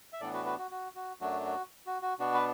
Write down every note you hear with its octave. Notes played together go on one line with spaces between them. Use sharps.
E5
A2 E3 B3 D4 A4 D5
F#4 B4
F#4 B4
F#4
F#4
F#4
F#2 F#3 A3 D4 F#4
F#4
F#4
F#4
B2 B3 D4 F#4
B4